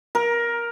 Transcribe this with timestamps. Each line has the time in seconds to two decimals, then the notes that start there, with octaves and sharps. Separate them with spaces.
0.15 A#4